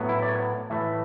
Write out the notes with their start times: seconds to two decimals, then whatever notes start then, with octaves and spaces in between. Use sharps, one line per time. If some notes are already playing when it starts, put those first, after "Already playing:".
Already playing: A2 F#3 B3
0.09 E4
0.22 D5
0.29 C#5
0.70 A2 E3 A3 E5